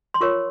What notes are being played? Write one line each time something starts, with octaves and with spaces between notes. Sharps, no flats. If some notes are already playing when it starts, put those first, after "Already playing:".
C6
F4 A#4 C#5 C#6